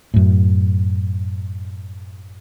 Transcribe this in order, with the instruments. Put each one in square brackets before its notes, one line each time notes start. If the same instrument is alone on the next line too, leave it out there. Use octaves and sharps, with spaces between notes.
[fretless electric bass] F#2 A2